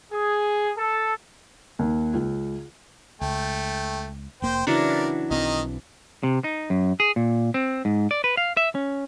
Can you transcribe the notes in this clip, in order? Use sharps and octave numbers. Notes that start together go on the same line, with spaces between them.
G#4
A4
D#2
C#2
C#2 A3 G5
F1 A#3 C5 G5
C#3 E3 F#3 D4 A#4 D5
B1 D#3 C4 D#5
C3
D#4
F#2
G#4
A#2
C4
G#2
D5
B4
F5
E5
C#4